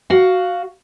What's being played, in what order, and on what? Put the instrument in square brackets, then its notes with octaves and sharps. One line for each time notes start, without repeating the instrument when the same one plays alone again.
[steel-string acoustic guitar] F#4 F5